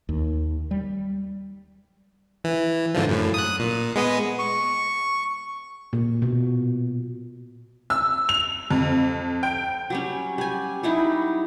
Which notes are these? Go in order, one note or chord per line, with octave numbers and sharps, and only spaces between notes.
D#2
G3
E3
G#2 D3 F3
F#2 A2
D#6 F#6
A#2
G#3 B3 D#5
C#6
A#2
B2
E6
F7
F2
G5
F#3 G3 C#4
G3 G#5
F#3 G3 D#4 E4